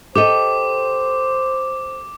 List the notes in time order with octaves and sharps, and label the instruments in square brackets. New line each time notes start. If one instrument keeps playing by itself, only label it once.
[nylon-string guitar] G4 A4 D#5 [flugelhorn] C5 [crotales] D6